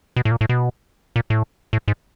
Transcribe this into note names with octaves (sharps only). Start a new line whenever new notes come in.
B2
A2
A#2
A2
B2
A#2
A2
A2
G#2